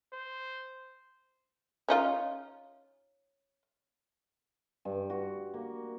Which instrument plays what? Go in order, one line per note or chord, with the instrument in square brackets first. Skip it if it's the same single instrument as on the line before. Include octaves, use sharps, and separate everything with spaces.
[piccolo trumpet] C5
[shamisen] C#4 D#4 F4
[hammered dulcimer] G2
F#4
A#3